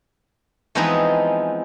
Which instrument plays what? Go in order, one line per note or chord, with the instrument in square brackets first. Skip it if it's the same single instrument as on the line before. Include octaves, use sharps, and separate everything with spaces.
[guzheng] E3 F3 G#3 B3 C4 D#4